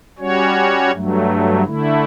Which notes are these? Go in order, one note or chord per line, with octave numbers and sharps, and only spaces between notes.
G3 C#4 F#4 C#5
G2 F#3 A3
D3 A3 E4